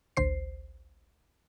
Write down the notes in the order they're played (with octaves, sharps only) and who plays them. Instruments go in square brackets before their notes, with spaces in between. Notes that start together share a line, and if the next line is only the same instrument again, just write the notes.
[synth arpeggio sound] A1 D2 C5 C7